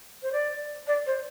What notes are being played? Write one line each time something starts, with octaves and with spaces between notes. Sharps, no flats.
C5
D5
D5
C5